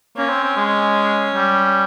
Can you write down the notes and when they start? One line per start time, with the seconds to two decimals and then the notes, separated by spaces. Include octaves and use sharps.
0.17 A#3 C#4
0.29 C4
0.43 C4
0.57 G#3
1.34 G3